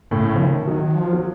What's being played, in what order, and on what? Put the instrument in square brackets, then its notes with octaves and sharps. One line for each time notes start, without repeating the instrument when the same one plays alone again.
[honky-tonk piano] A2 [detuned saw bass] C#3
[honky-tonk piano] F3
D#3
[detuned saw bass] D#3 [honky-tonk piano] F#3
[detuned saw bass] D#3
F3
[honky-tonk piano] F#3